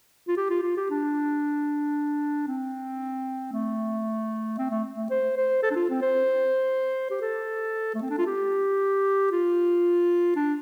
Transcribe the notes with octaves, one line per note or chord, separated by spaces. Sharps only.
F4
G4
F4
F4
G4
D4
C4
A3
C4
A3
A3
C5
C5
A4
D4
F4
C4
C5
G4
A4
A3
C4
D4
F4
G4
F4
D4